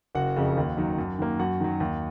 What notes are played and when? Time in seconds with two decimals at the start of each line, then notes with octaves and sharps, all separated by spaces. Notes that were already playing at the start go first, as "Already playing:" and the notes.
0.15 F#1 F#4 F#5
0.36 F2 C#3
0.57 D#2
0.77 D#3 F#3
0.98 F#2
1.19 D#3 A#3
1.39 F#2 F#4 F#5
1.60 D#3 F#3
1.80 D#2